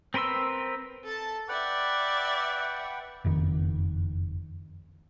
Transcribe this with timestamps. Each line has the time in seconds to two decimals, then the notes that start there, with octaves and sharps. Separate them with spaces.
0.14 C4 A#4 B4 C6 E6
1.05 A4 A5
1.49 B4 D5 E5 F#5 G5
3.25 F#1 F2 D#3